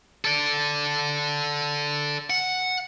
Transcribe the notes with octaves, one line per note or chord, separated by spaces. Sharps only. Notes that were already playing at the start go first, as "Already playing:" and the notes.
A4 D5
F#5